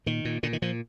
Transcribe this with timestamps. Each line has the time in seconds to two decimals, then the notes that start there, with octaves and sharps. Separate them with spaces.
0.06 A#2 D#3
0.25 A#2
0.43 A#2 D3
0.53 D#3
0.62 A#2 F3